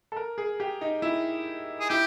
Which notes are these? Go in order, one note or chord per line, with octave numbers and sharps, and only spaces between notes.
A4
A#4
G#4
G4
D#4
E4
G#4
E4 G4